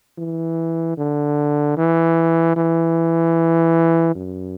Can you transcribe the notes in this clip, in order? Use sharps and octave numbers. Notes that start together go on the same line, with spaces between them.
E3
D3
E3
E3
F#2